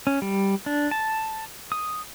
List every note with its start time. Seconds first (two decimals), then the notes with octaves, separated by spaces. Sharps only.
0.07 C#4
0.22 G3
0.66 D4
0.91 A5
1.72 D#6